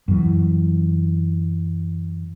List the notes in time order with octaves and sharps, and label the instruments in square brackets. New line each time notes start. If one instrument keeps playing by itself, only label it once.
[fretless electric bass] F#2 E3